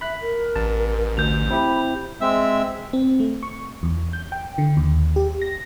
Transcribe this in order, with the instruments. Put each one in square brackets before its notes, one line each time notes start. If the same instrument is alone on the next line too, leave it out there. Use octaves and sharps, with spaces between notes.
[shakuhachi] E5 [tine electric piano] B5 F#6 B6
[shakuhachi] A#4
[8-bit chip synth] A1 [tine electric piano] A5
[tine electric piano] D2 [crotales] G6 F7
[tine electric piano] C4 E4 G4 [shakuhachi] B5
[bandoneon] G#3 C4 E5 E6
[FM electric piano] C4
A3
C#6
E2
G6
G5
D3
D#2
G4
A#6